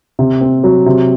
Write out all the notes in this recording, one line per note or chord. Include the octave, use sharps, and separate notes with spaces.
C3
C4
F#3
C3